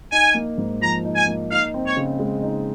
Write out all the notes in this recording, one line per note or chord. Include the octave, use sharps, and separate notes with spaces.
D#4 G#5
A#3
G#2
F3 A#5
D#4
G#5
A#3
D#4 F5
C4
C#5
C#3
G#3
D#4